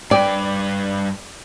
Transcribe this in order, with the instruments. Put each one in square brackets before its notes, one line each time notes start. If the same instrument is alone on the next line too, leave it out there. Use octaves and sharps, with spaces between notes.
[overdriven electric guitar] G2 B4 [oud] D5 [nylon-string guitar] G5